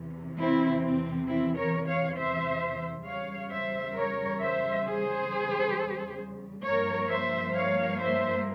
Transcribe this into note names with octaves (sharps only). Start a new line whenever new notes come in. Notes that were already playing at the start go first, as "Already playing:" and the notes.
Already playing: E2 C3 E3
C4 E4
C4
C4 E4
A#4 C#5
C#5 F5
C5 E5
E2 C#3 G3 C#5 F5
C5 E5
A#4 C#5
C5 E5
G#4 C5
G2 F3 A#3 A#4 C#5
C5 E5
C#5 F5
C5 E5